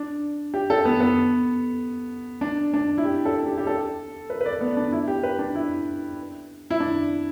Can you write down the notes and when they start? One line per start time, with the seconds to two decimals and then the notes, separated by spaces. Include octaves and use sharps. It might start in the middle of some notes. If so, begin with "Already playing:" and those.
Already playing: D4
0.54 G4
0.70 A4
0.85 B3
1.00 B3
2.41 D4
2.74 D4
2.98 E4
3.05 G4
3.25 A4
3.46 G4
3.58 G4
3.67 A4
4.30 B4
4.41 B4
4.46 D5
4.61 B3
4.77 D4
4.92 E4
5.08 G4
5.23 B4
5.39 D4
5.55 E4
6.70 E4
6.80 D4